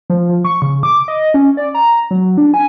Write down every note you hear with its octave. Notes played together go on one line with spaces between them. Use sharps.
F3
F3
C#6
C#3
D6
D#5
C#4
D5
A#5
F#3
D4
G#5